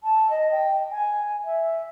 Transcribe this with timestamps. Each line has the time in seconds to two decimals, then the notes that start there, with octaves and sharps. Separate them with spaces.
0.03 A5
0.29 D#5
0.51 G5
0.91 G#5
1.44 E5